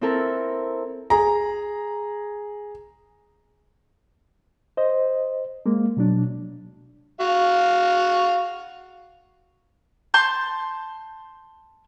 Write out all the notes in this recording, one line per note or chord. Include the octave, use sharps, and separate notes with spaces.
C4 E4 A4 A#4
G#4 A#5
C5 D#5
G#3 A#3
B2 F#3 D4
F#4 F5
A5 C6 G6